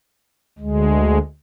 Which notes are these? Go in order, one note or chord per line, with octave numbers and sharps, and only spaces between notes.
D2 G#3